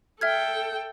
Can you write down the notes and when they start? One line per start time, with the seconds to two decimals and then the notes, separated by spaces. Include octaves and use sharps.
0.21 A4 E5 G5 F6 G#6